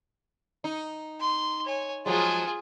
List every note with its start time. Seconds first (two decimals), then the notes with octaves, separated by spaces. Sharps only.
0.64 D#4
1.20 C6
1.65 C#5 G#5
2.06 F3 F#3 G#3 F4 G#4